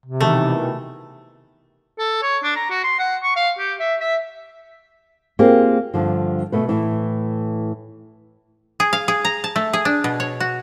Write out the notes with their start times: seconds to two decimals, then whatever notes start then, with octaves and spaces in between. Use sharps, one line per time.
0.06 C3
0.20 B2 D#3 E3 A3
1.99 A4
2.22 C#5
2.43 D4
2.56 A#5
2.70 F#4
2.84 C6
2.99 F#5
3.23 C#6
3.36 F5
3.59 G4
3.79 E5
4.00 E5
5.39 A#3 C4 F4 G4 G#4
5.94 G2 D3 F3
6.52 B2 A3 B4
6.69 A2 E3
8.80 G#4
8.93 F5
9.08 G#4
9.25 A#5
9.44 A5
9.56 A3
9.73 G#4
9.85 D4
10.04 B2
10.20 C#5
10.40 F#4